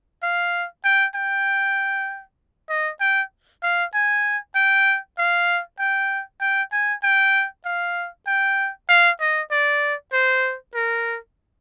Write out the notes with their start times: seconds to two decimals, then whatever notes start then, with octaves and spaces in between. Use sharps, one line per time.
0.23 F5
0.84 G5
1.15 G5
2.69 D#5
3.01 G5
3.63 F5
3.94 G#5
4.55 G5
5.18 F5
5.79 G5
6.41 G5
6.72 G#5
7.03 G5
7.65 F5
8.27 G5
8.89 F5
9.20 D#5
9.51 D5
10.13 C5
10.75 A#4